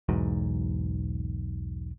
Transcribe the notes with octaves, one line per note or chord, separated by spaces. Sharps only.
B1 E2 G#2 F#3